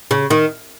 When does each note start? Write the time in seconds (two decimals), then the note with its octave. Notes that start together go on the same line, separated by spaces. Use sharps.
0.11 C#3
0.30 D#3